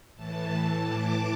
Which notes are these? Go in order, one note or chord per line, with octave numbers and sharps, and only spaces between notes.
A2 E3 A5
D6